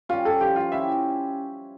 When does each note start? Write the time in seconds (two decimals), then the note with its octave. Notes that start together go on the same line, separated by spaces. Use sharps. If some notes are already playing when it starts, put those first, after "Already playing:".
0.09 G3 C#4 F4
0.25 A4
0.40 F3 G4
0.56 F4
0.72 C#4 E4 G4 E5